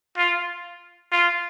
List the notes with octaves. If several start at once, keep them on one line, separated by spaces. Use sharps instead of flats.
F4
F4